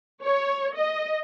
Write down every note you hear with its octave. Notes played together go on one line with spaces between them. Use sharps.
C#5
D#5